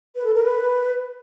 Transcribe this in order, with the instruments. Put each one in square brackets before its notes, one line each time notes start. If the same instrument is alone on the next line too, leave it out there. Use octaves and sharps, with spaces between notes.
[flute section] B4
A4
A#4
B4